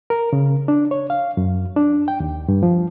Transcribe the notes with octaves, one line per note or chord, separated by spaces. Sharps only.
A#4
C#3
D4
C#5
F5
F#2
D4
G5
D#2
G2
F3